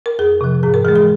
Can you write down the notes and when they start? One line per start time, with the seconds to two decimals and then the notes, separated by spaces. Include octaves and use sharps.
0.06 A#4
0.19 F2 G#4
0.41 C3 F3
0.63 G#2 G#4
0.74 A#4
0.85 E3 G#4
0.88 G#3
0.95 G#4